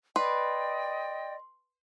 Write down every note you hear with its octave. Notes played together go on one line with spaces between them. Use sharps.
B4 D5 D#5 G5 C6